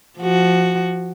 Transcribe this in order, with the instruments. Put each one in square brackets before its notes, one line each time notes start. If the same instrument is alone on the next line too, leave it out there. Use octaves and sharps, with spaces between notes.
[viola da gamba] F3 F#4